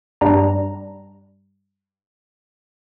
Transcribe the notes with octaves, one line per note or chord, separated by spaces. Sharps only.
G2 G3 D4 A#5